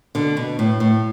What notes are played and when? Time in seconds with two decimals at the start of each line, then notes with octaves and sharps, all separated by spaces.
0.15 B2 D3
0.37 B2
0.59 A2
0.80 A2